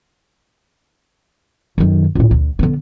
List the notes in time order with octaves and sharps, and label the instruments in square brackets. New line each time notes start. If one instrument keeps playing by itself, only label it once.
[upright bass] F#2 D#3
C#2 A2
D2
D3 B3